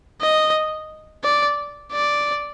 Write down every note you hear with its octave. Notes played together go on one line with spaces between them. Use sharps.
D#5
D5
D5